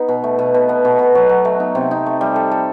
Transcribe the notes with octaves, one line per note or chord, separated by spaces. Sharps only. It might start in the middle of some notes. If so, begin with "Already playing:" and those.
Already playing: B3 D#4
B2
A3
B2
B2
B3
B2
B2
F#3
F#3
A3
D#4
C3
D#4
A3
G3
A4
A4